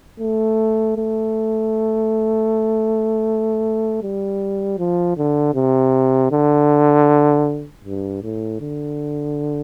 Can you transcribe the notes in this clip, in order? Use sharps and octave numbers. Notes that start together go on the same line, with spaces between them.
A3
A3
G3
F3
D3
C3
D3
G2
A2
D3